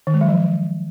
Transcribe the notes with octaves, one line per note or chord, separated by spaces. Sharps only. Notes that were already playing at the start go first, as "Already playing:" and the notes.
D#3
G#3
F#3
F3